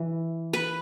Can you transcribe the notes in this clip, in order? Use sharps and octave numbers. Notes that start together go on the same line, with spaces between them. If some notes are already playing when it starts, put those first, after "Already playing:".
Already playing: E3
B4